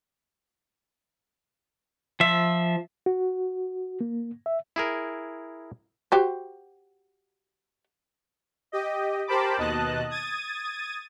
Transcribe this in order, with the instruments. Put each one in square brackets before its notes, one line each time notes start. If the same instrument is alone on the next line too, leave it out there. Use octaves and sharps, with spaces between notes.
[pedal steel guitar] F3 E5
[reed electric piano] F#4
A#3
E5
[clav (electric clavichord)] E4 G#4 A#4
[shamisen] F#4 G4 C5
[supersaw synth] G4 D#5
G4 A#4 C5 A5 B5 D6
D#2 B2 D#5 A5 F#6
D#6 G#6 A6 D#7